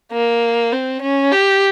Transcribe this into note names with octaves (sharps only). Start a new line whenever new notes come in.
A#3
C4
C#4
G4